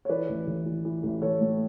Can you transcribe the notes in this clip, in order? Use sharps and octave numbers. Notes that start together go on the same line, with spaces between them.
C#5
E3 B4 D5
A1
A1
E3
E3
A1
A1 A4 C#5
A2